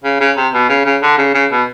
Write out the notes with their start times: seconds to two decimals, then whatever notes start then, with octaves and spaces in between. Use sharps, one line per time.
0.04 C#3
0.20 C#3
0.37 C3
0.54 B2
0.69 C#3
0.86 C#3
1.02 D3
1.18 C#3
1.34 C#3
1.51 B2